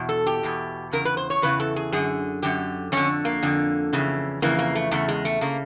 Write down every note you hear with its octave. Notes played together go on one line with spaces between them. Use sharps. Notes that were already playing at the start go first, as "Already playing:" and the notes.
Already playing: E2 B2
A4
G4
E2 B2
E2 C#3 A#4
B4
C5
C#5
E2 C#3 E3 B4
A4
G#4
F#2 D3 G#4
F#2 D3 G4
F2 D3 C#4
A#3
F2 D3
F2 C#3 E3
F2 C#3 E3 A#3
A#3
A3
E2 C#3 A3
G#3
A3
C#3 A#3